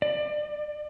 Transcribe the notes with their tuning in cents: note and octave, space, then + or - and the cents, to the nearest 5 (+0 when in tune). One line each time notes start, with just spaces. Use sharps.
D5 +30